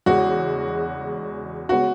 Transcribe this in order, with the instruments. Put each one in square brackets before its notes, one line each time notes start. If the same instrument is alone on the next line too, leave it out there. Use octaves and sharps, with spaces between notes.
[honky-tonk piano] E2 C#3 G#3 [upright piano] F#4
[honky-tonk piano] C#3 G#3 B3 [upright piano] F#4